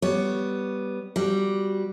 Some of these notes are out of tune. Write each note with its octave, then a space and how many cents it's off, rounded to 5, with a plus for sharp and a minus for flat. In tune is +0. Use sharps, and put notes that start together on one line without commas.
G3 +0 B3 +0 C#5 +0
G3 -5 F#4 +0